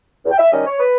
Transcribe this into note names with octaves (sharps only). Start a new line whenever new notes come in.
E2
G5
E5
D#3 G3 C#4 D#5
C#5
B4